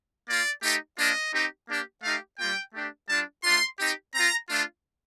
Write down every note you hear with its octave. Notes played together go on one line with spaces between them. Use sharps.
A#3 F4 D5
A3 D#4 G4
A#3 D4 F4 D#5
C4 D#4 G4
A#3 D4 G4
A3 D#4 G4 F5
G3 A#3 F4 G5
A3 D4 G4
G3 D4 F4 A5
A3 D4 F4 C6
C4 D#4 G4
C4 F4 A#5
A3 D4 F4